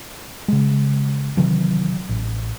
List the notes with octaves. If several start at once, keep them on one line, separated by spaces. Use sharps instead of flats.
C#3 G#3
C3 D#3 E3 F#3
A1